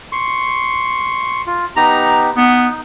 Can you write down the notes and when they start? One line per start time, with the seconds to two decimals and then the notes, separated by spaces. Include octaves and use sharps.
0.12 C6 C#6
1.47 F4
1.76 B3 D#4 G4 A#5
2.37 B3 D#4